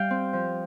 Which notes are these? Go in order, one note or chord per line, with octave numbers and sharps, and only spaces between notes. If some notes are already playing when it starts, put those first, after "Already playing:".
Already playing: G3 F5 G5
C4
F3